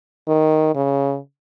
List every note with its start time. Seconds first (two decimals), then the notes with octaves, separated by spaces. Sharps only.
0.28 D#3
0.75 C#3